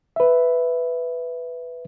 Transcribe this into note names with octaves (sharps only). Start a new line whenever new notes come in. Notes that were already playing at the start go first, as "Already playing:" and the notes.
B4 E5